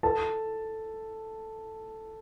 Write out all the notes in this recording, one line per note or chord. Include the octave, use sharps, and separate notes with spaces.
A4 A5